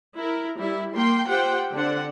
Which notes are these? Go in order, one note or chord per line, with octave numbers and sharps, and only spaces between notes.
E4 A#4
G3 E4
A#3 G5 C6
F4 G4 C5 F#5 G5
D3 C4 D4 F#5